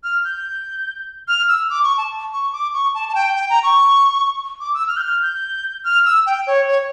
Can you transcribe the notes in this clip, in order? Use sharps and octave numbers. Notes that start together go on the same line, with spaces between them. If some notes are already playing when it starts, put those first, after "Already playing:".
F6
G6
F6
E6
D6
C#6
A5
C#6
D6
C#6
A5
A5
G5
G5
A#5
C#6
D6
E6
F6
G6
F6
G6
F6
E6
G5
C#5
C#5